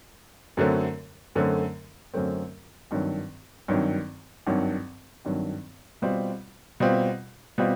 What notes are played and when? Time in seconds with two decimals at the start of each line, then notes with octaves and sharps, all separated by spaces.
0.57 F#2 D3 F#3 A3 C4
1.35 F#2 D3 F#3 A3 C4
2.14 F#2 D3 F#3 A3 C4
2.91 G#1 G2 D#3 F#3
3.68 G#1 G2 D#3 F#3
4.47 G#1 G2 D#3 F#3
5.25 G#1 G2 D#3 F#3
6.02 B2 G3 C4 F4
6.80 B2 G3 C4 F4
7.58 B2 G3 C4 F4